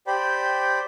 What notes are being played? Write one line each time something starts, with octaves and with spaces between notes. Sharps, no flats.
G4 C5 D5 G5 B5